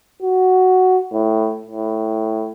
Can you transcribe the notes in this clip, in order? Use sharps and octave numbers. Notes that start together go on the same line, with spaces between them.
F#4
A2
A2